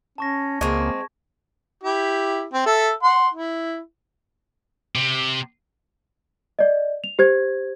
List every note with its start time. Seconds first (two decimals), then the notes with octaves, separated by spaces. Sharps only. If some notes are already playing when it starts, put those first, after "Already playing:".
0.18 C#4 A5 C#6 A#6
0.61 C#2 G#3 A#3 C4 C#6 G#6
1.84 E4 G4
2.53 C4
2.66 A4 E5
3.03 F#5 C6
3.34 E4
4.95 C3
6.59 D5 D#5
7.04 F7
7.19 G4 C5 G#6